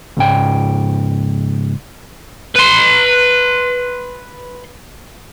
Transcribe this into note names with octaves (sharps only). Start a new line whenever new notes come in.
C#2 G#2 G5
B4 C6